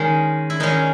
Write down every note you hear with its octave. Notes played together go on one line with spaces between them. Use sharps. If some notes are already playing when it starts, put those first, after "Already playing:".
Already playing: D#3 G#3 C#4
E4
D#3 G#3 C#4 D#4